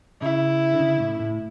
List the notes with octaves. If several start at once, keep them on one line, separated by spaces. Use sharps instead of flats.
C#3 E4
D3
C#3
A2
A2